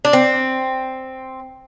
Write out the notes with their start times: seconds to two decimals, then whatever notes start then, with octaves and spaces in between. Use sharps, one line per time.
0.05 D4
0.13 C4